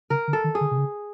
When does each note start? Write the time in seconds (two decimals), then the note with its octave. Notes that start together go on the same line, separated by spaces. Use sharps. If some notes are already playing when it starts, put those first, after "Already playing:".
0.10 C#3 A#4
0.28 D3
0.33 A4
0.44 D#3
0.55 G#4
0.61 D3
0.71 C3
0.78 C#3